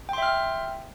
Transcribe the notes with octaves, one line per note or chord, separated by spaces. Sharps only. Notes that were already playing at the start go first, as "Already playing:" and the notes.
E5 G5 C6 F6